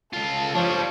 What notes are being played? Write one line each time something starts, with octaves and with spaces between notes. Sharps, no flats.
C#2 F4 A4
F3 G3 D4 C#5